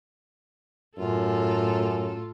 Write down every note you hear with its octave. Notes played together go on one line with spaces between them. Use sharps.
F#2 A2 F4 A4